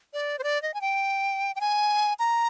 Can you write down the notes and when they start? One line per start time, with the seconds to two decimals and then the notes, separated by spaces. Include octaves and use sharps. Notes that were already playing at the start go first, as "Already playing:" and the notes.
0.13 D5
0.39 C5
0.43 D5
0.62 D#5
0.74 G#5
0.81 G5
1.56 G5
1.60 G#5
2.19 A#5